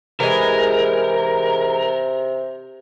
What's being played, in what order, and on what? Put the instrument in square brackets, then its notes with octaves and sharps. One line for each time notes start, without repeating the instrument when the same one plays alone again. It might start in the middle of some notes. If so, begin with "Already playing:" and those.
[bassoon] C3 [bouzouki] E3 G#3 [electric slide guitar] A#4